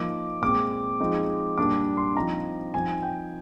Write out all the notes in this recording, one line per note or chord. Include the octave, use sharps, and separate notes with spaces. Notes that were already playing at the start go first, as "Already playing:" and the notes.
Already playing: F3 A#3 D#4 D6
A#2 G#3 C4 D6
F3 G#3 C4 D#4
A#2 G3 A#3 D4 D6
C6
F3 C4 D#4 A#5
F3 C4 D#4 G#5
G5